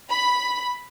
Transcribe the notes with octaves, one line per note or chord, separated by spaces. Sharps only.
B5